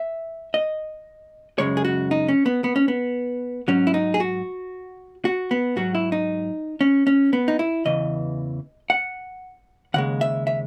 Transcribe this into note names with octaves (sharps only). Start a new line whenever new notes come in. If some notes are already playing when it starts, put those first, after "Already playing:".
Already playing: E5
D#5
F#2 C#3 G#3 C#5
G#4
F#4
D#4
C#4
B3
B3
C#4
B3
G#2 F#3 C#4
E4
D#4
G#4
F#4
F#4
B3
G#2 F#3 F#4
E4
D#4
C#4
C#4
B3
D#4
E4
E2 C#3 E3 D#5
F#5
D#2 C#3 G#3 F#5
E5
E5